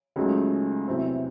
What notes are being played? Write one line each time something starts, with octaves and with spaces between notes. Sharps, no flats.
C#2 C#3 F#3 A3 D#4
E2 C3 F#3 C4 E4